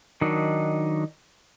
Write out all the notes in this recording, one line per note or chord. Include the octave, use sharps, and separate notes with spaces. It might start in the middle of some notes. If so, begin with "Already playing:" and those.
D#3 F#3 D4 D#4